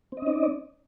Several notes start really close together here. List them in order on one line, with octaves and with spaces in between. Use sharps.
C4 D#5 C#4 D#4 D5